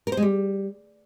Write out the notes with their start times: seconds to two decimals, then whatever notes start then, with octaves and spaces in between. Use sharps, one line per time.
0.07 A#4
0.12 C5
0.17 G#3
0.22 G3